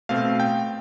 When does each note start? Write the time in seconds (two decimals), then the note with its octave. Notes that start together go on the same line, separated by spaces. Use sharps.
0.09 B2 A3 C4 F5
0.40 G5